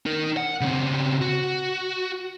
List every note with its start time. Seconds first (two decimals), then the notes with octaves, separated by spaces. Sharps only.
0.06 D#4 A#4
0.37 F#5
0.61 C#3 C4
1.21 F#4